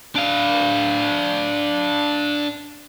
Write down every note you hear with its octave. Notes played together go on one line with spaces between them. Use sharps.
D4 F5